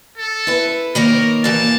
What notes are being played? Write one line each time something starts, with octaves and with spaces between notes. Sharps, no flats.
A4
E4 B4
D#3 A#3 A#4 C#5
A#2 E3 A#3 A5